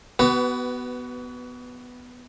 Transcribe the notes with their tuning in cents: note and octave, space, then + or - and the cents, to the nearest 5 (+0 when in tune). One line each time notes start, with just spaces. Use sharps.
B3 +0 F#4 +35 B4 +15